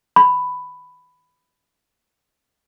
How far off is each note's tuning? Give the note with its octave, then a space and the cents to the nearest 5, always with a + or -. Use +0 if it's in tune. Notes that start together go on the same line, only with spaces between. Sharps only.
B5 +10